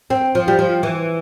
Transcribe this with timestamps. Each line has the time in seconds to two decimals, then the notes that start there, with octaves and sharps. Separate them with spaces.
0.10 C4
0.35 F3
0.48 G3
0.59 F3
0.83 E3